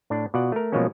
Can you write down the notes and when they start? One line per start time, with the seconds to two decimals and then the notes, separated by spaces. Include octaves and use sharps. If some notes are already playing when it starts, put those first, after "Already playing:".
0.10 A2 D4
0.34 B2 F4 D5 F#5
0.52 A3 A#4
0.72 B2 F3 F#3 G#3 A#3 C#4